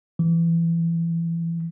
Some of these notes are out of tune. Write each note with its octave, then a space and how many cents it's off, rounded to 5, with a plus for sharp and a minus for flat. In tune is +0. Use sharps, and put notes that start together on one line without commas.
E3 +25